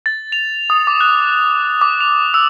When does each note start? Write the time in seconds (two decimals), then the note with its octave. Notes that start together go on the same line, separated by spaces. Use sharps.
0.06 A6
0.32 F7
0.70 D#6
0.87 D6
1.01 F#6
1.81 D6
2.01 F7
2.34 E6